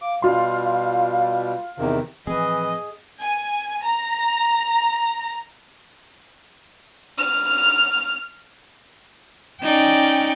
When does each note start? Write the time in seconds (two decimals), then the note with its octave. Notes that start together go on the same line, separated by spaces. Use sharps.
0.02 F5 D6
0.22 B2 G3 F4 F5 C6
1.78 E2 C3 D#3
2.27 A2 E3 F3 C4 G#4 D#5
3.20 G#5
3.83 A#5
7.18 F6
9.62 C#4 D#4 D5 G5